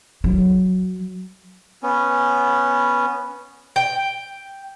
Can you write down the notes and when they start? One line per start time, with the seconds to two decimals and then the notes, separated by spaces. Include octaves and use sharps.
0.24 F#3
1.83 B3 C#4
3.76 G5